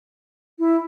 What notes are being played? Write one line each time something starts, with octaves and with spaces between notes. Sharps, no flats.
E4